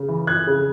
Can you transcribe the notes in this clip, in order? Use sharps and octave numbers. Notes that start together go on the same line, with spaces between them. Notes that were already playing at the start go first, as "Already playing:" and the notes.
Already playing: C#3
E3
F2 F#6 G#6
C#3